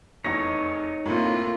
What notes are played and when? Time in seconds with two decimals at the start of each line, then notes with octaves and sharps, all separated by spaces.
0.24 F1 E2 D#4 C#5 A#6
1.06 A2 C3 A#3 F4